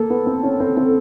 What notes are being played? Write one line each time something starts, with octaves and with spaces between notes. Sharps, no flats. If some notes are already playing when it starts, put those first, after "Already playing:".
Already playing: A#3 A4
B3
C4
C#4
C4
C4